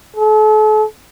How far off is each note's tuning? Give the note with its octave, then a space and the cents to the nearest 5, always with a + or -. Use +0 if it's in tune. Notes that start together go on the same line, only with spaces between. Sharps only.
A4 -40